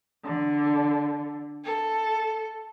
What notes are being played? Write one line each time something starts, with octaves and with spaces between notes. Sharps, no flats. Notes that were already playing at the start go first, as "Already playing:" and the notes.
D3
A4